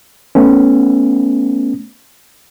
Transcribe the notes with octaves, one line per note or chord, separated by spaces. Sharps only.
A3 B3 C#4